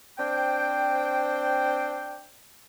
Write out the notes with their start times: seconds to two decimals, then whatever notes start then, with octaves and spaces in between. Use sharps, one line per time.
0.18 C4 D4 C5 G5